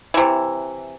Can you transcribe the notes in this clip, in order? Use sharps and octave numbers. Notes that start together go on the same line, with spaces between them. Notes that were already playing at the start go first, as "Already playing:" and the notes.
C3 E3